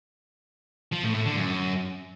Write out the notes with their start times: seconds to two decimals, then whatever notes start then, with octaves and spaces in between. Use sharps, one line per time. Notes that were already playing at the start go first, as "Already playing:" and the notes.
0.92 F3
1.03 A2
1.14 A2
1.26 D3
1.37 F#2